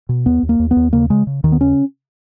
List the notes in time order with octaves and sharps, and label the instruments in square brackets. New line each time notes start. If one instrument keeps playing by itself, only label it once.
[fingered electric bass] B2
D#2 B3
D#2
A#3
D#2
B3
D#2
C#3 A#3
C#3 G#3
C#3
D#2 D#3
B3
C#3 C#4